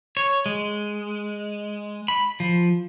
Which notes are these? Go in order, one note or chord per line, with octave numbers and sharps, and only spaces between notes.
C#5
G#3
B5
F3